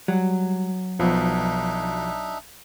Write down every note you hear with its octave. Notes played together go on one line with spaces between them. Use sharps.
F#3 G3
B1 B2 F3 B3 D4 D#4 E5